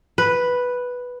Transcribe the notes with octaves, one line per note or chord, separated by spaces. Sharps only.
B4